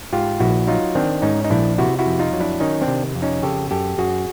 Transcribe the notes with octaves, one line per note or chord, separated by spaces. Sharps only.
G#2 F4 G4
A#1 E4 F#4
F#3 D#4 F4
D#3 C4 D4
G#2 C#4 D#4
D#4
A#1 D4 E4
C3 E4 F#4
E4 F#4
F2
D#4 F4
F#3
D4 E4
D#3 C#4 D#4
C4 D4
C3
F2
C#4 D#4
C#3 G4 A4
F#2 G4 A4
F#2 F#4 G#4